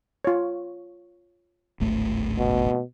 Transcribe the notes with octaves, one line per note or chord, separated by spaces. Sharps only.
F4 C#5
D1 G#1 A3
B2